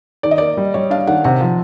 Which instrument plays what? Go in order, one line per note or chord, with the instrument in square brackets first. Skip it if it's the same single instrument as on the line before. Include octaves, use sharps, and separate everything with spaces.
[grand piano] D#3 [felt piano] D5
[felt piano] D#5
[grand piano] A#3 [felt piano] D5
[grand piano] G3
[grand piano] G3 [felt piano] C#5
[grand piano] D4 [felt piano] F5
[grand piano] D#3 [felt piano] F#5
[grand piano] C3 [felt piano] F#5
[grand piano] F3